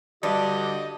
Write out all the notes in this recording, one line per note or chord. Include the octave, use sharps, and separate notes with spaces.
G2 D3 D4 F#4 G4 D#5